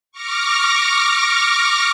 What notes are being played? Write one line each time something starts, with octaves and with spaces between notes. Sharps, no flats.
C#6 D6 F6 A#6